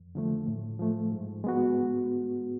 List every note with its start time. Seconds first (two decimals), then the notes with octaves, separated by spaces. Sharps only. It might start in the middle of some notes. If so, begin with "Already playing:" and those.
Already playing: F2
0.15 D3 F3 A3
0.47 A2
0.79 F3 A3
1.12 G#2
1.44 G#3 B3 F#4